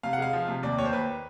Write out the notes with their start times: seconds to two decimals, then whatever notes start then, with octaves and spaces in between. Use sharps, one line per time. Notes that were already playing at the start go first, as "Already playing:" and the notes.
0.03 C3 F5
0.13 F#5
0.18 G#3 F5
0.33 F3
0.48 C3
0.63 D#2 D5
0.78 D#2 C#5
0.85 C5
0.93 D#2 B4